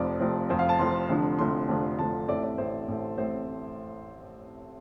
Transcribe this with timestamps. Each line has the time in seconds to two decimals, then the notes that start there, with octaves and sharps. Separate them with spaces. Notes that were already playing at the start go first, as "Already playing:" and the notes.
Already playing: F1 F2 F3 C4 D5
0.20 F1 F2 F3 C4
0.49 F1 F2 F3 C4 C5
0.59 F5
0.69 A5
0.79 F1 F2 F3 C4 C6
1.09 F1 F2 D3 F3 D4
1.39 F1 F2 D3 F3 D4 C6
1.69 F1 F2 D3 F3 D4
1.99 F1 F2 D3 F3 D4 A5
2.28 A1 A2 A3 C4 D5
2.43 D5
2.58 A1 A2 A3 C4 C5
2.88 A1 A2 A3 C4
3.17 A1 A2 A3 C4 C5